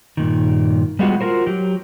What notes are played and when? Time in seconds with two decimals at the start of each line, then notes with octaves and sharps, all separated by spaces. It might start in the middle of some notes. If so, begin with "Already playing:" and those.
0.17 G2 A#2 D#3
0.99 G3 G#3 B3 F4 F#4
1.21 F4 F#4 A#4 C5
1.46 F#3 G4